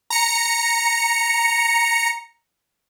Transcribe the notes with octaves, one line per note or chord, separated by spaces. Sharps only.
A#5 C#7